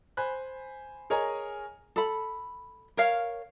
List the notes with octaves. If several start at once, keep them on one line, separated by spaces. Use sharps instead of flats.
C5 G#5 B5 F#6
G#4 A#4 C#5 D#5 G#5 A#5
A4 B5
A#4 C#5 F5